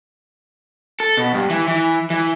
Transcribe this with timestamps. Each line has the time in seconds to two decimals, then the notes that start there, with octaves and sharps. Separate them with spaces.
1.00 A4
1.17 B2
1.34 G2
1.50 E3
1.68 E3
2.10 E3